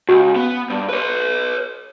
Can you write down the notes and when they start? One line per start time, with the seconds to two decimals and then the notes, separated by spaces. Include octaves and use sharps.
0.09 C#2 F#4
0.36 B3
0.70 G2
0.89 B4 C#5